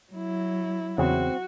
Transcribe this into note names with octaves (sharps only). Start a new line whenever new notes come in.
F#3 E4
E2 C#3 C4 F#4